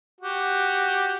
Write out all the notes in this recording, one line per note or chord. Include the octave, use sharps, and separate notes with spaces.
F#4 G4